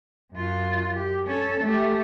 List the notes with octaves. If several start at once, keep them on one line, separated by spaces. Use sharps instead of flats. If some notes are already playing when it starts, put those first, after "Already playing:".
F#2 F4
G4
C#4 A4
A3 G4